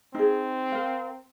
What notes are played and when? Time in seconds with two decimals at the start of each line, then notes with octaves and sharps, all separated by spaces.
0.15 C4 D#4 G#4
0.72 A#4 F5